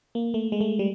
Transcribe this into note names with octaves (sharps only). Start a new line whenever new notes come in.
A#3
A3
G#3
A3
G3